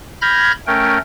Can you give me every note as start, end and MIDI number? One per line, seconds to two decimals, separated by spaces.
0.22 0.52 83
0.22 0.52 89
0.22 0.52 91
0.22 0.52 92
0.22 0.52 94
0.67 0.98 57
0.67 0.98 61
0.67 0.98 70
0.67 0.98 79